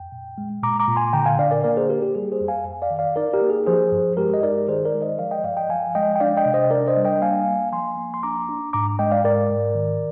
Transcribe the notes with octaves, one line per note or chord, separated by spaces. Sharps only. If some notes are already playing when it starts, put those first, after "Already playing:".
Already playing: F2 G5
A#2
G#3
A#2 A#5 D6
A#5 D6
A#2
G#5 C6
D3 G5 A#5
F5 G#5
D4 D5 F5
A#4 D5
A#3 A#4 D5
G#4 C5
A#3 G4 A#4
G4
G3 G#4
G#4 C5
F2
F5 G#5
F2
D5 F5
D#3
D5 F5
D#4 A#4 D5
G4 A#4
A#3
G#4
F3 G#4 C5
G2
G#3 G4 A#4
D#5
D#4 A#4 D5
D#3 G#4 C5
A#4 D5
G#3
C5 D#5
F3 D5 F5
D#5 G5
G2 D5 F5
D#5 G5
F3 F5 G#5
G#3 D#5 G5
G5
D4 D5 F5
D#5 G5
C3
C5 D#5
D4 A#4 D5
C5 D#5
G3
D#5 G5
A#3 F5 G#5
A#3
F3 G#5 C6
A#3
C6
D4 A#5 D6
D4
G#2 A#5 D6
G#3 D#5 G5
D5 F5
G#2 A#4 D5
G#2
D#3